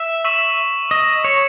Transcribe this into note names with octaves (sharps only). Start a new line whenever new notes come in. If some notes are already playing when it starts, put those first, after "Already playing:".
Already playing: E5
C#6 E6 B6 E7
D#5
C#5